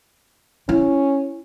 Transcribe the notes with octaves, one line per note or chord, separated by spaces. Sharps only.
C#4 E4